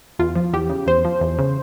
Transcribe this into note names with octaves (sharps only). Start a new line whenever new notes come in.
E2 F4
F3
E2 G4
C#3
E2 C5
F3
E2
C#3